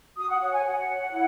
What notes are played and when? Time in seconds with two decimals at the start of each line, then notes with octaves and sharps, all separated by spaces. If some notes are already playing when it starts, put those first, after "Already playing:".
0.17 F#4 D#6
0.29 F#5
0.40 C#5 F#5
0.53 G#5
0.64 F#4 F#5
0.88 C#5
1.12 E4